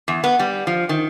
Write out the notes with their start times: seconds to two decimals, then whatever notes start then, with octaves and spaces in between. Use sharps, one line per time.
0.08 E2
0.24 B3
0.39 G3
0.67 F3
0.89 D#3